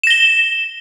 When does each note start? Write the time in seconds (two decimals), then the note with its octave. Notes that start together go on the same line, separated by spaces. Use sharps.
0.04 E7
0.07 A#6
0.10 G7